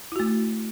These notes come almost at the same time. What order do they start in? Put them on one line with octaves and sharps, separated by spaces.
E4 F#4 A3